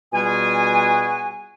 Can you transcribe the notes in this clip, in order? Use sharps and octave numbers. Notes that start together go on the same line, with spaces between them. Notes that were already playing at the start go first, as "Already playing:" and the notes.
B2 G3 F4 F#4 G#4 G#5